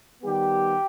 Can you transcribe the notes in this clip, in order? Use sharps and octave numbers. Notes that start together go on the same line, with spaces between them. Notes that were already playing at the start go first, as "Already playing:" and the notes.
D#3 G3 B3 G4